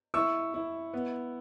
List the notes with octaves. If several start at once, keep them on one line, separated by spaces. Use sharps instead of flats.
E4 C#6 E6
E4
B3